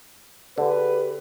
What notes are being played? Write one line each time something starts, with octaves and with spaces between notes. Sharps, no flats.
D3 G4 G#4 B4